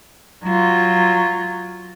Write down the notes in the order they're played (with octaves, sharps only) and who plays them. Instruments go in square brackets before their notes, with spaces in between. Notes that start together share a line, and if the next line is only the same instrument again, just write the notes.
[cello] F#3 F4